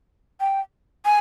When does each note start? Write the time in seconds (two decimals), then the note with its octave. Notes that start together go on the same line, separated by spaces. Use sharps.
0.41 G5
1.05 G#5